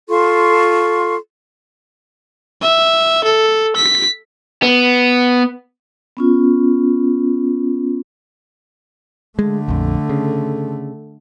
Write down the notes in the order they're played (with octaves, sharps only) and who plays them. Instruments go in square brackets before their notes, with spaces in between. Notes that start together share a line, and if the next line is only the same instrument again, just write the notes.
[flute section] F4 A4 C6 C#6
[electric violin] E5
A4
B6
[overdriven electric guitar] B3
[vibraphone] B3 C#4 F4
[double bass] D3 A3 [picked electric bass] G#3
[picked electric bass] A#1 F2
C#3